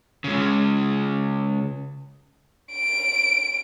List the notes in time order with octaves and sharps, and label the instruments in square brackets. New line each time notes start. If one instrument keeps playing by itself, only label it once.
[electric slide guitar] C#3 G#3
[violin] D7